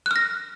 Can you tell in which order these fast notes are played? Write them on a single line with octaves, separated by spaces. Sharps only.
F#6 F6 A#6